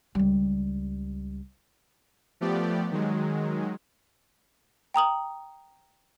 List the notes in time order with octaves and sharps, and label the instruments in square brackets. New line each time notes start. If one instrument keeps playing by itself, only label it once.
[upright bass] C#2 G3
[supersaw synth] F3 A3 B3 G4 D5
D#3 F#3 G#3
[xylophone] G5 A#5 D#6 F#7